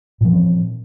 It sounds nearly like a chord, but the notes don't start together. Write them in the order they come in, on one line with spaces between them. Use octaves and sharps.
A#2 F3 E3 C4